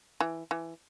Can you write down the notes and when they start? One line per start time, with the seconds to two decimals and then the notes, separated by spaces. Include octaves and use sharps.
0.21 E3
0.51 E3